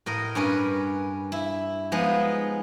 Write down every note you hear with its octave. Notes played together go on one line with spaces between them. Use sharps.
A2 A#4 D#5
G2 C#4 A#4 B4
E4
F3 G#3 B3 D#4